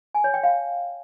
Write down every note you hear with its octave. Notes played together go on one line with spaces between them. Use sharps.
G#5
C#5
G5
F5